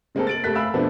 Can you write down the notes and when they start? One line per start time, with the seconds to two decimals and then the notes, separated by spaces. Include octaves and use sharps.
0.15 C#3 G#3 A#3 C4 A4
0.27 A6 D7 F#7
0.44 F1 A3 F#6 B6
0.55 E5 F5 G#5 B5 E6
0.74 F2 B2 F3 A3 B3 D4